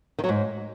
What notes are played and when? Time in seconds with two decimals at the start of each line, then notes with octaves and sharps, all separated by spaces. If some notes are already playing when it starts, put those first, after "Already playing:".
0.19 D#3
0.24 F#3
0.29 G#2